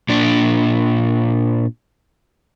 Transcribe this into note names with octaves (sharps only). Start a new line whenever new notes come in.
A#2 D4